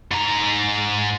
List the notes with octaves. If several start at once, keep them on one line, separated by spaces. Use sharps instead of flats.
G#2 A#5